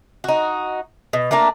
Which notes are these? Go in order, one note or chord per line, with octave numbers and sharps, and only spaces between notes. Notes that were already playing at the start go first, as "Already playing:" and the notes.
D#4 F#4
B2
A3 A#3 D4 A#4